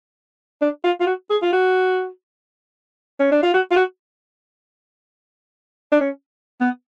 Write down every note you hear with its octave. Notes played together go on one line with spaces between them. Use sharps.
D4
F4
F4
F#4
G#4
F4
F#4
C#4
D4
F4
F#4
F4
F#4
D4
C#4
B3